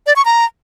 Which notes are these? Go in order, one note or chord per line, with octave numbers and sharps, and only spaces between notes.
D5
C#6
A#5